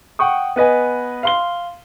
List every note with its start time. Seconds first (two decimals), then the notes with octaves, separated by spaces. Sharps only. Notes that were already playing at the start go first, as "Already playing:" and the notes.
0.19 F#5 G5 C#6 D#6
0.56 B3 B4 D#5 G#5
1.23 F5 C6 G7